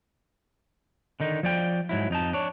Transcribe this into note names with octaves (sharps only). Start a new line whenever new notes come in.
D3 D#3 D#4
F3 D5 G5
G#2 F#3 E4
F2 D#4 A5
D4 C#5